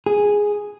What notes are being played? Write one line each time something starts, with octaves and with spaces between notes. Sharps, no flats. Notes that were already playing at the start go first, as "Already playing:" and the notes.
G#4